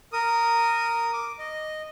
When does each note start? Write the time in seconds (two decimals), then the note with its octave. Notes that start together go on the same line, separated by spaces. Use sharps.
0.13 A#4 D#6
1.13 D6
1.39 D#5